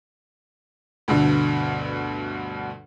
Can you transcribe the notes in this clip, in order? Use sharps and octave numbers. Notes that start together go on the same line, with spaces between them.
D2 G2 B2 D3